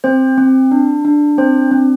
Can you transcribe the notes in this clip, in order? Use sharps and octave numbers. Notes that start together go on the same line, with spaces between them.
C4 C5
C4
D4
D4
C4 C5
C4